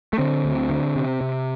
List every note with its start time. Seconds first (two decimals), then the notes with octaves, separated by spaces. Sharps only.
0.13 A3
0.18 D3 C4
0.45 D2
0.70 D3
0.96 C3
1.21 C3